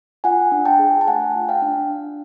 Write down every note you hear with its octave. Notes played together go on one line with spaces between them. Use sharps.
F4 F#5 G#5
D4
G5 A5
G#4
A5
A3 F#5 G#5
F4
F5 G5
D4
D4